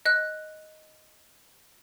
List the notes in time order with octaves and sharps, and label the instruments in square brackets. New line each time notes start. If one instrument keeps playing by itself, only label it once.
[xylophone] D#5 F#6